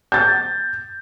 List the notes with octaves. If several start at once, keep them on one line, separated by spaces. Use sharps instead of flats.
G6 A6